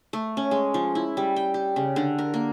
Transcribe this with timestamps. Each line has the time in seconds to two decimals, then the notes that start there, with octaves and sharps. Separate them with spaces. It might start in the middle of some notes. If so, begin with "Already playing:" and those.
0.13 A3
0.37 C#4
0.51 G#3
0.74 F3
0.95 E4
1.17 G3
1.36 G5
1.54 G4
1.76 C#3
1.96 D3
2.19 A#4
2.34 A#3